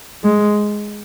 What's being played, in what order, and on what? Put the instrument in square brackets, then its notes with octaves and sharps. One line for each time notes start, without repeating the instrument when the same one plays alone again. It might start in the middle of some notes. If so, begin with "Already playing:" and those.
[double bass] G#3